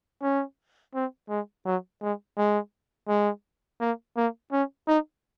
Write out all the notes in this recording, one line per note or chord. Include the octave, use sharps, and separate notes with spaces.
C#4
C4
G#3
F#3
G#3
G#3
G#3
A#3
A#3
C#4
D#4